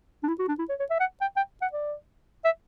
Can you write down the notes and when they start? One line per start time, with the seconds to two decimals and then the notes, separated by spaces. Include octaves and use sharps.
0.23 D4
0.28 E4
0.39 F#4
0.48 D4
0.59 E4
0.69 C#5
0.80 C#5
0.90 E5
1.00 F#5
1.21 G5
1.36 G5
1.62 F#5
1.73 D5
2.45 E5